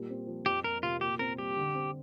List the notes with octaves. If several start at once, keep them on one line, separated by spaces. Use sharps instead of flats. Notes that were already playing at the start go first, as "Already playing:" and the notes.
Already playing: A#2 G3
C4
F3
F2 G4
A#3 A#4
C3 F4
A#2 G4
C4 A#4
G3 G4
D3
C4